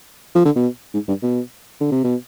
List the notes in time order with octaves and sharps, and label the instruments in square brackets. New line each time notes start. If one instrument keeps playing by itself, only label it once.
[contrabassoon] F3
D3
B2
G#2
G2
B2
D3
C3
B2